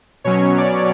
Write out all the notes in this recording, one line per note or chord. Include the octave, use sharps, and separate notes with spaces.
B2 F#3 C#4 C#5
D5